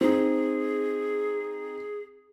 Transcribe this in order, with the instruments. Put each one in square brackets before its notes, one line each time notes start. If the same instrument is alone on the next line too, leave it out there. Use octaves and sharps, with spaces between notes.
[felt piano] C4 D#4 [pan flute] G#4